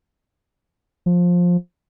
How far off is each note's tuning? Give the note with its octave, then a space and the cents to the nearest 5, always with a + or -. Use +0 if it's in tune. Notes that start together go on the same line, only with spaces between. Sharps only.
F3 +15